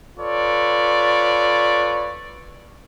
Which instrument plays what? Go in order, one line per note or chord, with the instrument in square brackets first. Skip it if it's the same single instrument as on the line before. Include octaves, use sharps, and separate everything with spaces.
[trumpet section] F4 A4 B4 C#5 D5